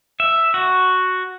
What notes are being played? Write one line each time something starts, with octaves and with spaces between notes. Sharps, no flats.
E5
F#4